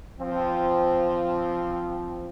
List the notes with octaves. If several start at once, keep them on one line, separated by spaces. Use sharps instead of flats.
F3 C4